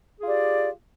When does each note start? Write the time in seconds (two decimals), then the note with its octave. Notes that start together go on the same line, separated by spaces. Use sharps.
0.21 G#4
0.23 F4
0.26 G4
0.28 D5